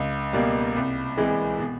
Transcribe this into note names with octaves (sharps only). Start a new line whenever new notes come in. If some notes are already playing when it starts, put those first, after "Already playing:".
Already playing: C#2
B2 G3 A#3
C2
C3 E3 G#3
B2